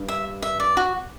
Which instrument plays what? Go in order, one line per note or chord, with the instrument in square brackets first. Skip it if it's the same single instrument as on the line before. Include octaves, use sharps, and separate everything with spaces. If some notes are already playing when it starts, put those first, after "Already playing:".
Already playing: [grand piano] G2
[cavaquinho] E5
E5
D5
F#4